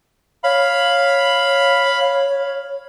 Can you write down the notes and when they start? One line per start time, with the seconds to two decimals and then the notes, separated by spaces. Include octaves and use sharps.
0.44 C#5 F5 B5